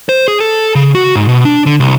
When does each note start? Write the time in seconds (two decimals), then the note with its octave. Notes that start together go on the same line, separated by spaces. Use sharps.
0.09 C5
0.28 G#4
0.40 A4
0.75 C#3
0.95 F#4
1.15 G#2
1.29 B2
1.45 D4
1.66 D3
1.80 C2